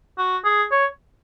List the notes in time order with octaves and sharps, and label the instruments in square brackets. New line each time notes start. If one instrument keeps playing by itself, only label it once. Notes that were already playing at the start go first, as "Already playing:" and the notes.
[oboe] F#4
G#4
C#5